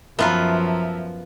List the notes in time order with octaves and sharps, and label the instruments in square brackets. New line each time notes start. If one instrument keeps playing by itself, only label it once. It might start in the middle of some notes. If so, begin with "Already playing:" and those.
[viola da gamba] F#2 F3 [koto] B3 F4 B4 [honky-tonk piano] E5 A5 A#5